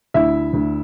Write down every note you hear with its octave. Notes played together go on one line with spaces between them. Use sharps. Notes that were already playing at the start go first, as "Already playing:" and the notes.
D2 E4 E5
D2